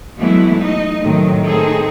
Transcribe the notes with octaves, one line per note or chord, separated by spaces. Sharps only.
E3 F#3 G#3 A3 B3 E4
D#4 D#5
A2 C3 D#3 F#3 A3
D#3 A3 C4 D#4 G#4 A4